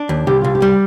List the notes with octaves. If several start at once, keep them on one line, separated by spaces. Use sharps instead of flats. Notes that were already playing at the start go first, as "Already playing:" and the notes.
Already playing: D4
D#2
C2 G4
C2 F4
G4
G3